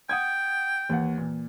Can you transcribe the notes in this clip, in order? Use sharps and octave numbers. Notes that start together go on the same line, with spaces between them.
F#5 G5 D#6 G#6
D#2 E3 F#5
A#2 E3